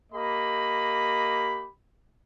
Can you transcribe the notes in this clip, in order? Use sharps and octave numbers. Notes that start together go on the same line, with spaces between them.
A#3 G4 D#5 B5